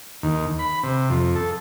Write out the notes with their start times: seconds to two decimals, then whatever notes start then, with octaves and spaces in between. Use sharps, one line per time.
0.23 D#2
0.59 B5
0.83 C3
1.10 F2
1.36 A4